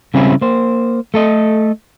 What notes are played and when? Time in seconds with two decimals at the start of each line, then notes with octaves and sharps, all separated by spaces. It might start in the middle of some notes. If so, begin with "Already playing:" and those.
0.14 C#3 G3 C4 C#4 E4 G#4
0.42 A#3 C5
1.14 A3 A4 D#5